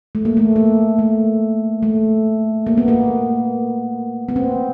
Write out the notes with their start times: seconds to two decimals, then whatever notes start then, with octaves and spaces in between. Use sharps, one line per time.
0.15 A3
0.25 A#3
0.37 A3
0.56 A#3
0.99 A3
1.83 A3
2.67 A#3
2.78 B3
2.88 A#3
4.28 B3
4.36 C4